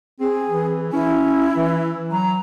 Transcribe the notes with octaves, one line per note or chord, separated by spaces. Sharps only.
C4 G#4
E3
C#4 E4
E3
F#3 A#5